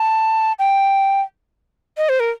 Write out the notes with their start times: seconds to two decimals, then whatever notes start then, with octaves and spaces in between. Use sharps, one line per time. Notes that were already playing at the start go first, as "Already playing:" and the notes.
Already playing: A5
0.59 G5
1.97 D#5
2.09 C5
2.20 A#4